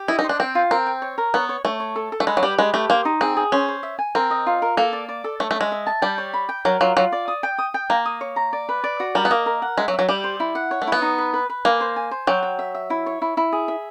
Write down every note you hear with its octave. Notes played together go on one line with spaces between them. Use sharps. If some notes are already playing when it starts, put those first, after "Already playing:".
Already playing: G4
E4 D#5
D#4
C5
D4
C4 G5
F4
C4 A#4
G5
C#5
A#4
B3 C#5
C#5
A3 C#5
C#5
A4
A4
A3
G#3 B4
F#3
G3 G4
G#3 B4
A3 G4
A#3 C5
D#4
C4 G#4
G#4
C#4 C5
C5
E5
G#5
C4 A#4
D#5
F4
A#4
A#3 A4
D5
D5
A4
A3 C#5
A3
G#3 E5
E5
A5
G3 G5
C#5
B5
G5
F#3 A#4
F#3 F4
F#3 F4
D5
D#6
G5
D#6
G5
A#3 A#5
D#6
C#5
A#5
D5
B4
D5
F#4
G3 A#4
B3
A#3 D#5
A#4
F#5
G#3 E5
F#3
E5
F#3
G3 G4
C5
E4
F#5
C#5
A3
B3 E4
D#4
B4
B4
B4
A#3 G#5
C5
G#5
C5
F#3 G5
G5
E5
E5
E4
C#5
E4
E4
G#4
E5